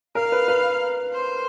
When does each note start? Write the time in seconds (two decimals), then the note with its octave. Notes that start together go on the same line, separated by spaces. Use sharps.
0.15 A#4 F5
0.32 B4
0.48 B4
1.13 C5